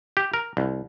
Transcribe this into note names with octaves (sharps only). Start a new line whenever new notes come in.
G4
A#4
C2